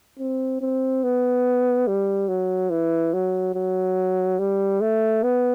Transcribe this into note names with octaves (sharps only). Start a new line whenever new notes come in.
C4
C4
B3
G3
F#3
E3
F#3
F#3
G3
A3
B3